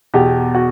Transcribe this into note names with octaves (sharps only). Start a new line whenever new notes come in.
E2 B2 G4
F#4